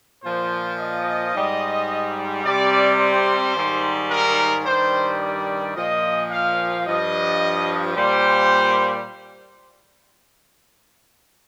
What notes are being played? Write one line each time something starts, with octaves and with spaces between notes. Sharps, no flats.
A#2 F3 C5
D#5
G#2 G3
C3 G3 D5
C5
G#2 D#3 G3
A#4
G2 D#3 G3 C5
D5
A#2 F3 D#5
F5
G2 F3 D#5
A#2 G3 C5